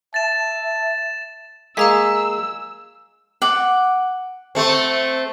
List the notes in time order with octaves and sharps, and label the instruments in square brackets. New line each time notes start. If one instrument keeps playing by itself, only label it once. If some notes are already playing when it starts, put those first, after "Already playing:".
[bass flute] E5 [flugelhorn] A5 [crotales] A6 E7
[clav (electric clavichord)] G#3 A#3 G#4 [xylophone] F5 A#5 B6 [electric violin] E6
[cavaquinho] F#5 D6
[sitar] A3 C4